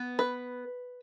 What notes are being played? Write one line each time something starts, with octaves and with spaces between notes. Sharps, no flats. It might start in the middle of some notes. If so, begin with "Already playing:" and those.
Already playing: B3
B4